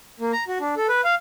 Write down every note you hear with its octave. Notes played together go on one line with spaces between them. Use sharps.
A#3
A#5
F#4
D4
A4
B4
F5